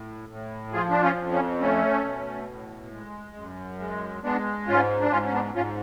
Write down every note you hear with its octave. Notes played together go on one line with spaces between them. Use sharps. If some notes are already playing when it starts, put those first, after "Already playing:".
Already playing: A2
A2
F3 F4 G#4
D4
C#4 F4
F2
C#4
A3 C#4
B2
A2
G#3
F#2
G#3
G#3 B3 D4
G#2 C#4 F4
D4
G#2 C#4 F4
C#4
B3 D4
G#2 C#4 F4